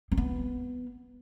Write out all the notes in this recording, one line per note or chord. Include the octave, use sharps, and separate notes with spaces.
C4
B3